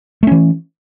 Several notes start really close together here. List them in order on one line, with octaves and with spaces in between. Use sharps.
A3 C#4 E3